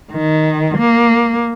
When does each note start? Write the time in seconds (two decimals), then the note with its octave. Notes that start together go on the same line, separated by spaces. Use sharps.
0.12 D#3
0.78 A#3